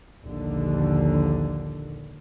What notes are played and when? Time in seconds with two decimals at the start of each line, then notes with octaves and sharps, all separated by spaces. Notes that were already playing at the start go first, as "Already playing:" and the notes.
0.24 A#1 D#2 D3